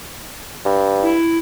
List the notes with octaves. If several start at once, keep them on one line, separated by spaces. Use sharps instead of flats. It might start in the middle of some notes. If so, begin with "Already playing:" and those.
G2
E4